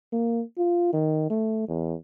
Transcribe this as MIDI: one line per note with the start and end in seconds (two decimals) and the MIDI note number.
0.13 0.43 58
0.58 0.90 65
0.93 1.27 51
1.30 1.68 57
1.68 1.95 40